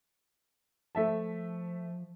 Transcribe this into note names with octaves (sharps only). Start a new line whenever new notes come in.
F3 A3 E5 A5